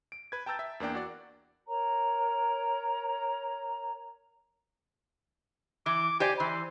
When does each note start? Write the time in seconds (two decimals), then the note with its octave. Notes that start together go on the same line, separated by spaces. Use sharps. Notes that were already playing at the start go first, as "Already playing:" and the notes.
0.12 D7
0.32 B4 G#6
0.46 G5 A5 A#5 E6 G6 A6
0.59 E5
0.80 E2 A#3 D4 G5
0.95 F#4 D5
1.68 A#4 C#5 A#5
5.86 E3 D6
6.20 G4 C5 D5 G#5
6.40 E3 C5